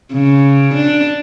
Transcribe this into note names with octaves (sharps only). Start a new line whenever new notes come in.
C#3
D4